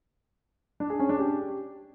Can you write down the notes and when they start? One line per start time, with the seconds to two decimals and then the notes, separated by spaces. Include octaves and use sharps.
0.80 D4
0.90 G#4
1.00 C#4
1.09 D4
1.19 G4